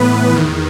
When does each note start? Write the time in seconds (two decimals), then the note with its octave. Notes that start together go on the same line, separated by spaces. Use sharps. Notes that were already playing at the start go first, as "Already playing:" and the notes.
Already playing: A2 E3 B3 B4
0.32 E2 D#3